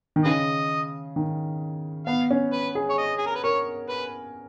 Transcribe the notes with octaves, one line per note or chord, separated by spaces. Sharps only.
D#3
C#3 G#4 B4 D#5
D#3
B3 F5
C#4
B4
G#4
C#5
D#5
G#4
A#4
B4
A#4 C#5
B4